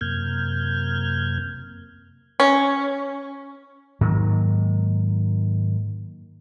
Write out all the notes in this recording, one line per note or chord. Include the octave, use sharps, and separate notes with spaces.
F#2 C3 A#3 F6 G6 G#6
C#4
G#2 D#3 F#3 A#3